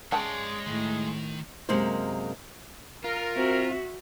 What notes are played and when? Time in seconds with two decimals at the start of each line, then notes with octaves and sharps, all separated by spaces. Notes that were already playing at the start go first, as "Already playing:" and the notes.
0.12 C#3 G#3 C#5 D5 G5 A5
0.67 A2 D#3
1.69 F#2 C3 G#3 A#3 C5
3.04 F4 A#4
3.36 C4 F#4 E5